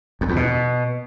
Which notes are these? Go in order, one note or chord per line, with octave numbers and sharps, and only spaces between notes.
F2
E2
B2